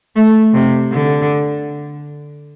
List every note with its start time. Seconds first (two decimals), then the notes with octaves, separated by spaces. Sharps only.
0.16 A3
0.54 C3
0.92 D3